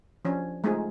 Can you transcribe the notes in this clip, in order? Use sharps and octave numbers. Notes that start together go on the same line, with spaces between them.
F3 C#4 D4
G#3 A3 C4 D#4 F4 G#4